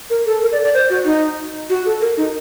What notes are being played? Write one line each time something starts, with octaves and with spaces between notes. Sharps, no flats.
A#4
A4
A#4
D5
D5
C5
F#4
D#4
F#4
A4
A#4
D#4